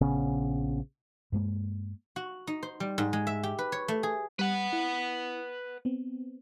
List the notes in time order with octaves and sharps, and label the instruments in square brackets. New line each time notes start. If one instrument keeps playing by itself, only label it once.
[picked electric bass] A#1 C#3 B3 C#4
[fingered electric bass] G2 G#3 A#3
[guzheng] F#4
D#4
C5
G3
G#2
G#3
E5
G4
B4
C#5
A3
G#4
[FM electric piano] G3 [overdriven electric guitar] B4 F#5
[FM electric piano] E4
B3 C4